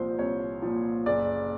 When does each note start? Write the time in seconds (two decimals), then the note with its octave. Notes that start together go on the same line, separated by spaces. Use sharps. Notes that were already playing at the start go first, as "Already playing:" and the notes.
Already playing: C2 A#2 F3 C5
0.19 C2 C#5
0.62 A#2 F3
1.06 F#1 D5